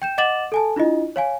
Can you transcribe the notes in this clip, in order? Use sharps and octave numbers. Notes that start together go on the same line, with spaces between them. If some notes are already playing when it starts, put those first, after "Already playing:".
G5 G6 E7
D#5 F#5 D6 A6 E7 F#7
A4 G#5 A5
D4 E4 F4 D#5
C#5 F5 G#5